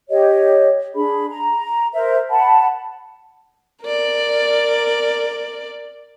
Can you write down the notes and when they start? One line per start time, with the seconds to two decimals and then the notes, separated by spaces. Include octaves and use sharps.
0.09 G4 C#5 D#5
0.95 D4 G#4 B5
1.29 A#5
1.94 A#4 C5 E5
2.30 F#5 A5 B5
3.84 A#4 D5